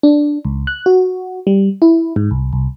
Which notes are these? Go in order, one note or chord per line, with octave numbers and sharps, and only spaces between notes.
D4
C#2
F#6
F#4
G3
E4
G#2
C2
C2